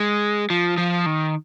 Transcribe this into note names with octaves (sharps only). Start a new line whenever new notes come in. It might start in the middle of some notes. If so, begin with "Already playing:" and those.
Already playing: G#3
F3
F3
D#3